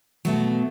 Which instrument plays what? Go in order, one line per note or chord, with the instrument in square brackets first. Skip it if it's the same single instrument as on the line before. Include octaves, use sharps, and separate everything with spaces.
[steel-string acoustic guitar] B2 F#3 A3